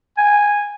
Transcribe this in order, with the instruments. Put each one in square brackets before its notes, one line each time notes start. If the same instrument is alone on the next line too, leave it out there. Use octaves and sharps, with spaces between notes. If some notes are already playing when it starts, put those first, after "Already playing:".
[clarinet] G#5